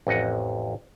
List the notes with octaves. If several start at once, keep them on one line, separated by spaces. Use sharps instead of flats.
A1 F2 D#5 F#5